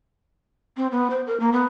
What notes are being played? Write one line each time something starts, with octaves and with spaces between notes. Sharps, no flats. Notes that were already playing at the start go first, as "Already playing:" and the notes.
C4
B3
C5
A#4
A#3
B3